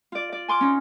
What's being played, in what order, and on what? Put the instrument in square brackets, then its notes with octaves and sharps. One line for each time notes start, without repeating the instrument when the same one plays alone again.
[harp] F4 D5
D5
G#5 C6 D6 F6
C#4 D#4